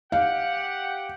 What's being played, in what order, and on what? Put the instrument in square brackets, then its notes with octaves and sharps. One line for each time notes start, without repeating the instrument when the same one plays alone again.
[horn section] G4 F#5 [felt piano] F5